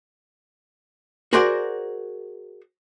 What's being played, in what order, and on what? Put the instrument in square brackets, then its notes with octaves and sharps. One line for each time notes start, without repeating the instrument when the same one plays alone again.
[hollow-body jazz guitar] F#4 G#4 A#4 C5 D5 F#5